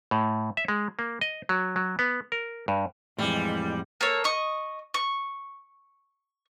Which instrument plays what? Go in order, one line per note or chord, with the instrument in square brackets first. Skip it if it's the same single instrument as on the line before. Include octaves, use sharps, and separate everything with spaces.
[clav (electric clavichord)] A2
E5
G#3
A#3
D#5
F#3
F#3
B3
A#4
G2
[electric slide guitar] F2 A2 [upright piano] E3 [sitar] G3 [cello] G#3
[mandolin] A#3 A4 C#5
D#5 C#6
C#6